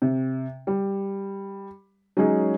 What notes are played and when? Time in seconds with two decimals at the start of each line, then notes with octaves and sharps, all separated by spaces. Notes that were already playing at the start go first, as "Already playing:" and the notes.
0.02 C3
0.67 G3
2.17 F#3 G#3 C#4 D#4 G#4